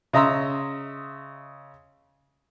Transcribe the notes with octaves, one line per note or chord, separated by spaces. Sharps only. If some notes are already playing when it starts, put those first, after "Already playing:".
C#3 D#5 E5 A#5 C6 E6